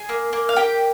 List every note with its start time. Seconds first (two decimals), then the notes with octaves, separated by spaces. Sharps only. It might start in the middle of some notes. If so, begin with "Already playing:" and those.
Already playing: G#4 G#5
0.09 A#3
0.33 A#3
0.49 F5
0.56 A#3 G4 G5